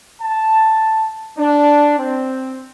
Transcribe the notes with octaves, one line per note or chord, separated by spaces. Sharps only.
A5
D4
C4